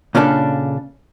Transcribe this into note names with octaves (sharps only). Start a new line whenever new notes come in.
A#2 C#3 C#4 D4 G4 A4